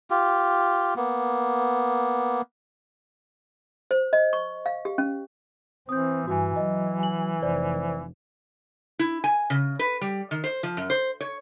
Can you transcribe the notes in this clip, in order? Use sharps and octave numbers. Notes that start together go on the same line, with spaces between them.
F4 G4
A#3 B3
C5
D#5
C#6
F5
G4
C#4
E3 C4 D#6 G6
G2 E3 F#4 G#5
F#3 D#5
G#5 F#7
F1 C5 D5
E4
G#5
C#3
B4
G3
D#3
C5
F3
F#2
C5
C#5